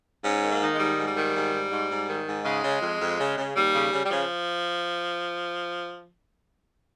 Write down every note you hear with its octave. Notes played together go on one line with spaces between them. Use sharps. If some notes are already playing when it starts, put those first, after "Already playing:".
G#2 C#4
D#3
A#3
D#3
G#3
G#2 G3
G#2
G3
D#3
G#2
G#2
G#2
G#2
D#3
G#2
C#3 G#3
C#3
F2
F2
C#3
C#3
D#2 G3
C#3
C#3
G3
C#3 F3